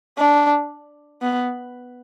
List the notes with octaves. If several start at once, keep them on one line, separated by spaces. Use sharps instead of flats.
D4
B3